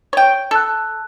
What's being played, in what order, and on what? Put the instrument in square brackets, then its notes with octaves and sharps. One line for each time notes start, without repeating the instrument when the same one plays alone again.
[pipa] C#5 G5
[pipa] A4 [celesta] A5 E6 F#6